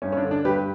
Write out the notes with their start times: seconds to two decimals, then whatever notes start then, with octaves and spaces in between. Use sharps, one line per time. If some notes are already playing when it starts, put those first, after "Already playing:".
0.02 G2 C#4
0.12 C#4
0.17 D4
0.24 D3
0.31 D4
0.45 G2 G4 B4